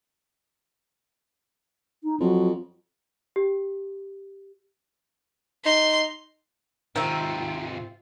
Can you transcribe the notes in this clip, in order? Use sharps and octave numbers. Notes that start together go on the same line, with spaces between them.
D#4
F2 F#3
G4
D#4 C6
G#2 C3 D#3 C4 F4 E5